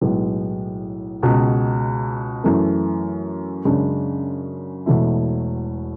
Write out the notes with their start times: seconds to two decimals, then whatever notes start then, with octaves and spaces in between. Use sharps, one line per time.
0.01 B1 A2 G#3 B3
1.23 C#2 B2 G#3
2.44 F#2 E3 A3
3.65 F#2 C#3 G#3 D4
4.86 E1 E2 B2 A3 E4